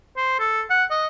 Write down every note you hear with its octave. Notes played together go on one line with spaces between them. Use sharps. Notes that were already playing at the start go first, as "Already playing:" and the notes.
C5
A4
F#5
D#5